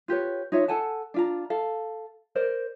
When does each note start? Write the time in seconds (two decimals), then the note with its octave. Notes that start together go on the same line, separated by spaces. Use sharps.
0.08 F4 G4 B4 C#5
0.52 D#4 F4 C#5 E5
0.68 A4 F#5 G#5 A5
1.14 D4 F4 A#5
1.50 A4 F5
2.35 A#4 C5 D5